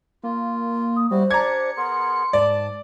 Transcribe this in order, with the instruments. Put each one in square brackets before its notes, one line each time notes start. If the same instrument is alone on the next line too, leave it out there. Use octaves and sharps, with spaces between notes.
[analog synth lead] A#3 [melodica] F4
[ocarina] D#6
[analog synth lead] G3 [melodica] E4 F#4 [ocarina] C5
[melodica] D4 G4 D5 [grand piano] A#5 G#6 [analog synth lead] C#7
[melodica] B3 G#4 A#4 [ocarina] C6
[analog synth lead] G#2 [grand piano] D5 [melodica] A5